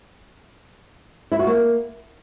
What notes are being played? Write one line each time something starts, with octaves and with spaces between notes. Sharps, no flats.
E4
F#4
A#3